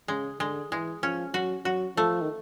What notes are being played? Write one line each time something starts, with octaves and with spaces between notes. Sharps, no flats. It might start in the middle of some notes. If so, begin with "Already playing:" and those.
C#3 G#3
D3 G#3
E3 G#3
F3 C#4
F#3 F#4
F#3 F#4
F3 A3
D#3